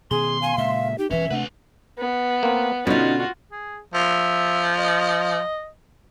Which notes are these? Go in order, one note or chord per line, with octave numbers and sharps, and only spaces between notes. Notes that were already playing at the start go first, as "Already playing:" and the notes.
B2 D#3 G#4 C6
F5 G#5
A#2 C#3 G#3 E5
D#4 G4
E1 G2 E3 C#4 B4 E5
D#2 C3 A3 D4 B4 F#5
B3
A#3 C4
B2 D3 B3 C#4 D#4 F4 F#4
G#4
F3 E5
D#5